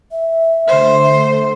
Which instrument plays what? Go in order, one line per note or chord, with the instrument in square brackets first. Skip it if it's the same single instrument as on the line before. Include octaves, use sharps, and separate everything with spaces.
[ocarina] E5
[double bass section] D3 A3 [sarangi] C5